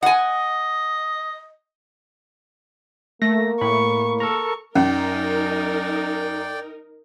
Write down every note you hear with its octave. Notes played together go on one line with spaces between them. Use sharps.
D#5 F#5 G#5
A3 A#3 A#6
A2 B5 C#6
A4 A#4 A#5 C#6
F#2 C#4 D#4 A#4 D5 G5